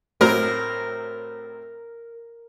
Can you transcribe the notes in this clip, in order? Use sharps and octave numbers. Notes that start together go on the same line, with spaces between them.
A2 F#3 C4 A#4